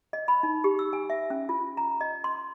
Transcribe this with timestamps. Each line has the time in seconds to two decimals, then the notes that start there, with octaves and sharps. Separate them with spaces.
0.13 D#5
0.28 B5
0.43 D#4
0.64 G4
0.79 E6
0.93 G#5
1.10 E5
1.30 C#4
1.49 F4
1.77 A#5
2.01 D#5
2.24 C6